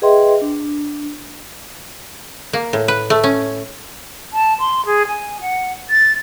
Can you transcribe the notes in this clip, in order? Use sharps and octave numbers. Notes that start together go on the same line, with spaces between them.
G#4 B4 D#5 E5 G5 C6
D4
A#3
A2
B4
A3
C#4
A5
C6
G#4
G#5
F#5
A6